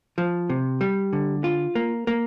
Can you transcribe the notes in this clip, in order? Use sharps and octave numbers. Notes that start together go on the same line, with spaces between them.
F3
C3
G3
D3
F4
A#3
A#3